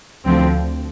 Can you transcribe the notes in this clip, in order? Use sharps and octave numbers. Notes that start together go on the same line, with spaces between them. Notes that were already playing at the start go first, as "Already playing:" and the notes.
D2 D3 F3 C4